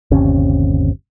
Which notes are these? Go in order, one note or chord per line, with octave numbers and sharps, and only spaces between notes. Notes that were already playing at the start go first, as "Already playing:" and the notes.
G1 D#2 C3 C#4